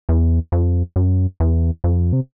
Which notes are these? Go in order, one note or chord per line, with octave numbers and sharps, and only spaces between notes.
E2
F2
F#2
E2
F2
C3